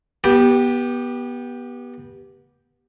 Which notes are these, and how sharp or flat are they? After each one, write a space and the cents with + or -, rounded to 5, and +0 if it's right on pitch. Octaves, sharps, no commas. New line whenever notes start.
B3 -25 G4 +0